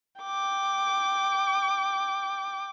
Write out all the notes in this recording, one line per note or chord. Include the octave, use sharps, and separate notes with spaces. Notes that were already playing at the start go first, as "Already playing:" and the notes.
G5 D6